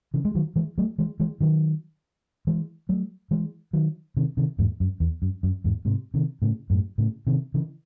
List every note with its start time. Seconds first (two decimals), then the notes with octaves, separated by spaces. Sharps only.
0.14 C#3 E3
0.25 G#3
0.35 D#3 F#3
0.56 E3 G#3
0.78 F#3 A3
0.98 E3 G#3
1.20 E3 G#3
1.41 D#3 F#3
2.47 E3 G#3
2.89 F#3 A3
3.31 E3 G#3
3.73 D#3 F#3
4.17 C3 D#3
4.37 C3 D#3
4.59 E2 G#2
4.80 F#2
5.00 E2
5.22 F#2
5.43 F#2
5.64 E2 G#2
5.85 G#2 C3
6.14 C3 D#3
6.42 A2 C#3
6.70 F#2 A2
6.98 A2 C#3
7.27 C3 D#3
7.54 C#3 E3